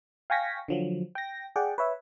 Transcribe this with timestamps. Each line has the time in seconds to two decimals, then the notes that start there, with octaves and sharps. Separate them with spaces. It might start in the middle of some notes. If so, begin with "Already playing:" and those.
0.30 F5 G5 G#5 C#6 A#6 B6
0.68 D3 F3 F#3
1.15 G5 A#6
1.56 G#4 D5 F#5 G5
1.78 B4 C#5 E5